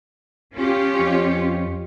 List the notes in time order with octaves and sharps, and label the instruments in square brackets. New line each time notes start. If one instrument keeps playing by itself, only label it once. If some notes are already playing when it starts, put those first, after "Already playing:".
[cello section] C#4 F4 G4
[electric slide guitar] F2 C#5